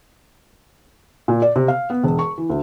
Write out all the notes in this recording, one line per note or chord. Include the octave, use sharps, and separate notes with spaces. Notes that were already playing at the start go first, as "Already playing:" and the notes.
A#2
D5
C3
F5
B3
E1
C#6
E3
D2